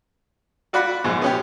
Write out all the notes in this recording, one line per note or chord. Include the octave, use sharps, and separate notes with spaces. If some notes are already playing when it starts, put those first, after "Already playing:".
F4 F#4 D5 F#5 B5
A#1 G#2
B3 C#4 G4